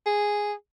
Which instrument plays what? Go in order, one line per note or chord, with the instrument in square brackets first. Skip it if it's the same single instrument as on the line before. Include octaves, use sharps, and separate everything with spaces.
[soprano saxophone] G#4